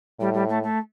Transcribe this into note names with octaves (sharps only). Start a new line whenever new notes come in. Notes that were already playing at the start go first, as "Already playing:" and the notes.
A2 G3
G3
A3
A3